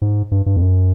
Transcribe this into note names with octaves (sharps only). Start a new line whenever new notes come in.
G#2
G2
G2
F2
F#2